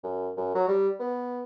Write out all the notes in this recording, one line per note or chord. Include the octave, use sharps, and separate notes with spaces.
F#2
F#2
F#3
G3
B3